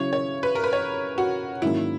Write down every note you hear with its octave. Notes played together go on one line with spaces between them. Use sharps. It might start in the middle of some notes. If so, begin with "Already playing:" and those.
Already playing: C#3 F#3 C#4 E4 C#5
C#5
B4
A#4
B4
C#5
F#4
G#2 D#3 F#3 A#3 C#4 E4